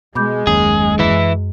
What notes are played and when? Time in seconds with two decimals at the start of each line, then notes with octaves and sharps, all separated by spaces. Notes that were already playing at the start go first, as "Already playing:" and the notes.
0.15 B2 G#3 B5 D6 G6
0.47 F#1 D#2 C#3 G#4
0.99 F#2 E3 E4